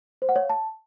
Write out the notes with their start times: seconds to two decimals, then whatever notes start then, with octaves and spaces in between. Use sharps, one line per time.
0.22 C5
0.29 F#5
0.36 C#5
0.43 F5
0.50 A5